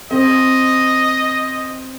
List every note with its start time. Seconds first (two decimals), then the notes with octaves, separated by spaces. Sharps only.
0.11 C4 D#5